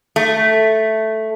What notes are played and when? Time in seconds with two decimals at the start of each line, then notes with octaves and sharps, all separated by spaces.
0.16 A3